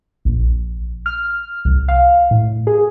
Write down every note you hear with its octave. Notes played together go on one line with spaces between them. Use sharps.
A#1
F6
C2
F5
A2
G#4